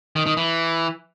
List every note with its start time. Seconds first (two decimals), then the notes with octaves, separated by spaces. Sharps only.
0.16 D#3
0.26 D#3
0.37 E3